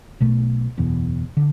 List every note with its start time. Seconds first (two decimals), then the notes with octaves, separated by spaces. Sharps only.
0.20 B1 B2 A3
0.77 F#1 E2 B2
1.37 D3